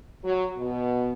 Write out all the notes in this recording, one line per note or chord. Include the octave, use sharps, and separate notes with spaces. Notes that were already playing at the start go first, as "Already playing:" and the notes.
F#3
B2